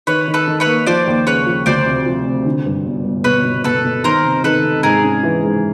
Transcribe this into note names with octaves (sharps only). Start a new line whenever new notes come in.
D#3 B4 C#5
D#3
A4 B4
D#3
B4 C#5
A#3
F3 C5 D5
D#2
C#3 B4 C#5
F3
D2 C5 D5
C3
F3
C3
D3
G2
G1
G1
B2 B4 C#5
B2
B2 A4 B4
B2
D#3 A#4 C5
C3
D#3 A4 B4
C3
G#2 G#4 A#4
C#4
E3
G#2